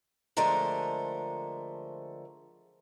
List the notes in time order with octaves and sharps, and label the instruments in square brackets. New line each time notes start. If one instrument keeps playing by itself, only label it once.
[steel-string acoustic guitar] D3 F3 G#3 A3 A#4 C5